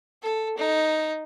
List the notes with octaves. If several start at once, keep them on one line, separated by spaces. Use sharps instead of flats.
A4
D#4